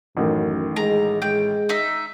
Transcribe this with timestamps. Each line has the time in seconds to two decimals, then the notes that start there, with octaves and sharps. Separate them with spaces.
0.17 A1 F#2 A2 D#3
0.76 G#3 A#5
1.22 G#3 G5
1.69 D#4 E5